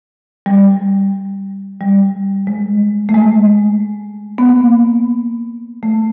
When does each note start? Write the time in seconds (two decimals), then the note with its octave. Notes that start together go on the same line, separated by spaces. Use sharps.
0.46 G3
1.81 G3
2.47 G#3
3.09 A3
3.14 G#3
4.38 B3
4.49 A#3
5.83 A3